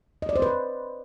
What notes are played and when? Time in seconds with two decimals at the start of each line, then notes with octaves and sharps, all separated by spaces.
0.22 D#5
0.29 D5
0.36 C5
0.42 B4